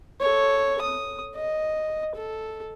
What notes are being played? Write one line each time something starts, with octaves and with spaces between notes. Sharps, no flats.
A4 C#5
D#6
D#5
A4